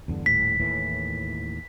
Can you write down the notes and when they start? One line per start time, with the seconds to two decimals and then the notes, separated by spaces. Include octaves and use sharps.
0.08 E2 G2 D3
0.26 D#1 A2 B6
0.60 D#2 A2 E3